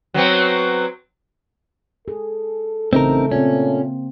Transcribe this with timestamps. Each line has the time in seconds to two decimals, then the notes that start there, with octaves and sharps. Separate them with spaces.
0.14 F#3 B3 C4
2.08 G#4 A4
2.93 A1 C#3 A3 C4 D#4 A#4
3.32 A#2 A#3 C4 C#4